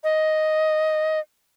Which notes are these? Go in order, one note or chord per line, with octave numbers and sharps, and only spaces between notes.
D#5